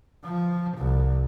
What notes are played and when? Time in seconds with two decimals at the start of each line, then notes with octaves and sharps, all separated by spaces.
0.25 F3
0.78 C2